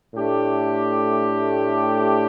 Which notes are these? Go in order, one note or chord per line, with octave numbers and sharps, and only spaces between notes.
A2 A3 D4 G4